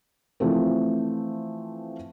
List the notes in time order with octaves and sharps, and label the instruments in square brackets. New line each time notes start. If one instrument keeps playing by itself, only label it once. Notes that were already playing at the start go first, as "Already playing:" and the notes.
[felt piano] E3 F3 A3 C4